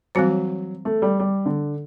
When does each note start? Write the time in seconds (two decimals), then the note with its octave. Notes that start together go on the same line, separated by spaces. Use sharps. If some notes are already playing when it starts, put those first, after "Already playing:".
0.15 E3 F#3 G3 C4 F#4 C5
0.85 A3
1.02 G3
1.20 G3
1.46 D3